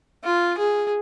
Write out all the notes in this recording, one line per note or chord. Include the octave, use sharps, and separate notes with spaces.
F4
G#4